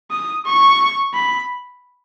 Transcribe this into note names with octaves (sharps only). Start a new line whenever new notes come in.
D#6
C#6
B5